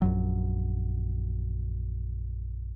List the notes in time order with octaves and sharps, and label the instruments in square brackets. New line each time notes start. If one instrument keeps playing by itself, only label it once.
[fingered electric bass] A#1 F#2 F#3